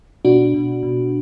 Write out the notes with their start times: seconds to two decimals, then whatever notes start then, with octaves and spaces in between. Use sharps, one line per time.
0.25 B2 D4 F#4
0.54 B2
0.83 B2